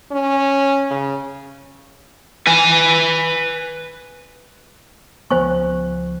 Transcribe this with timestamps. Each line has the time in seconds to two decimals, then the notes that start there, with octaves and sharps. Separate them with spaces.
0.12 C#4
0.91 C#3
2.47 B4 G#5
5.31 C#2 F3 B3 C5 G#5 C#6